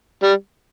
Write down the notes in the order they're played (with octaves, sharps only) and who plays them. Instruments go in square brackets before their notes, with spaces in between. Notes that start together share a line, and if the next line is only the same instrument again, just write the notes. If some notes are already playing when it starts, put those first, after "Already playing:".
[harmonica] G3